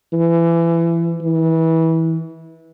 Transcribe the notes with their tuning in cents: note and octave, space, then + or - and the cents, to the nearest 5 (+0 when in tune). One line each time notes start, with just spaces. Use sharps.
E3 +25
E3 -25